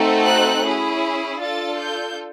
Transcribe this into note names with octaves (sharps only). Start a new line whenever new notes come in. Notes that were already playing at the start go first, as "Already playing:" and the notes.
Already playing: A3 C4 D#4 F#4 A4
F#6
C#4 E4 G#4
D4 F4 A4 A6
G6